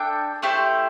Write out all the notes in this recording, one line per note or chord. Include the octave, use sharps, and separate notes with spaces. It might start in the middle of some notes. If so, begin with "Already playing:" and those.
Already playing: D4 A4 E5 G5
A3 E4 G4 C5